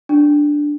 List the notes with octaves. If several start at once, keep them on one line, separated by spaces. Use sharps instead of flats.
D4